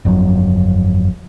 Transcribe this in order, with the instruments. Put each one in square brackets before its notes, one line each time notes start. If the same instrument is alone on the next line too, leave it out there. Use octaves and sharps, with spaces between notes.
[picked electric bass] G1 F2 D3 F#3